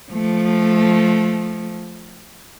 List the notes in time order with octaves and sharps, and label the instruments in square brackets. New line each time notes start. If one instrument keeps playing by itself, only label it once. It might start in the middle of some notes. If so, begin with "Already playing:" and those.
[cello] F3 A3